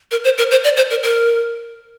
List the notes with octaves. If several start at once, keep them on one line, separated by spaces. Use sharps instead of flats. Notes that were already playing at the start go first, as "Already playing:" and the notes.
A#4
C5
A#4
C5
D5
C5
A#4
A#4